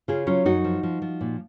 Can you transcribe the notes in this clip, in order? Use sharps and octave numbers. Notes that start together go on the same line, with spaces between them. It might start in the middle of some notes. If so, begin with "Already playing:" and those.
C#3 F4 G#4
F#3 C#4 F4
F#2 D#4 F#4
F3
F3
F3
A#2